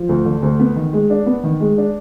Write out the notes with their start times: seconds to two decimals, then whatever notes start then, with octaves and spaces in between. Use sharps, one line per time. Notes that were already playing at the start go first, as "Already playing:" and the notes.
Already playing: F3
0.09 D2
0.25 D3
0.43 D2
0.60 B3
0.76 D#3
0.93 G#3
1.10 D4
1.26 B3
1.43 D#3
1.60 G#3
1.78 D4